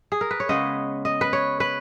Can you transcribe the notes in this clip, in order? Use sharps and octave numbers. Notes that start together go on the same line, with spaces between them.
G#4
A#4
B4
C#5
C#3 G#3 B3 D#5
D#5
B4
C#5
B4